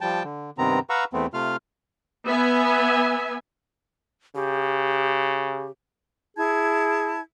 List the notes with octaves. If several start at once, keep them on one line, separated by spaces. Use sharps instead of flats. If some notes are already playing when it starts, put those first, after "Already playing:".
F3 G3 G5 A5
D3
G2 C3 D#3 B3 C4 A#5
B4 F5 F#5 A#5 C#6 E6
E2 A3 B3 C4
C3 A3 F4 F5 F6
B3 E5 G#5
C#3 G4
E4 G#4 A5 G#6